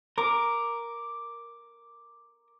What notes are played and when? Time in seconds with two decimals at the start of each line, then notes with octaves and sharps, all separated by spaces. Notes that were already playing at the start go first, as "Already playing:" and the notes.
0.18 A#4 D6